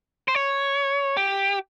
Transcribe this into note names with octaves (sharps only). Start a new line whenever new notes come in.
C5
C#5
G4